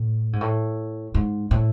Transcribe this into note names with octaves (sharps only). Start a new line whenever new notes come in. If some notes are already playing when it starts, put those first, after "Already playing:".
Already playing: A2
G#2
A2
G#2
A2